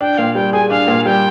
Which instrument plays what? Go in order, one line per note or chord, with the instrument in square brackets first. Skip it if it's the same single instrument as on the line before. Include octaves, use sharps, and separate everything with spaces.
[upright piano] D4 [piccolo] G5
[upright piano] A#2 [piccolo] F5
[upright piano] G3 [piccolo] G5
[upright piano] G#4 [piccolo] G#5
[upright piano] D4 [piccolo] F5
[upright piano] A#2
[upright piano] G3 [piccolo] G5